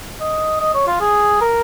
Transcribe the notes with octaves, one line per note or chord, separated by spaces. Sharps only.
D#5
D#5
C#5
F4
G#4
A#4